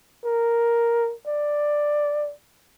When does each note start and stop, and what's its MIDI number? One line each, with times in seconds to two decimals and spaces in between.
0.25 1.14 70
1.27 2.32 74